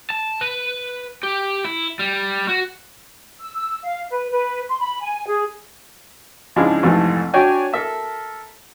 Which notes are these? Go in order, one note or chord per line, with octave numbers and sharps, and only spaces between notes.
A5
B4
G4
E4
G3
F#4
E6
E6
F5
B4
B4
C6
B5
G#5
G#4
G#2 C#3 F3 G#3 D4 E4
F2 G#2 C3 E3 A3
D4 F#4 C#5 D5 G5 G#5
A4 A#4 E5 A5